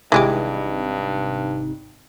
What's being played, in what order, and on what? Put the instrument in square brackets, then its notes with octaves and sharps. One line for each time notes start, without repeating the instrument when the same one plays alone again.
[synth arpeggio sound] G#1 C3 D#4 [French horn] G2 [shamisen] E3 G#3 G4